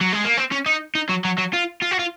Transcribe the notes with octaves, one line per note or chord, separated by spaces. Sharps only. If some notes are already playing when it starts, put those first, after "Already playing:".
F#3
G#3
A#3
C4
C#4
D#4
D#4
F#3
F#3
F#3
F4
F4
F#4
F4